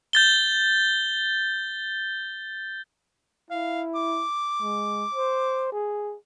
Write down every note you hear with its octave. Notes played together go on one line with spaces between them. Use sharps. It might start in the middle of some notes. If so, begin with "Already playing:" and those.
G6 A6 G7
E4 F5
D6
G#3
C5
G#4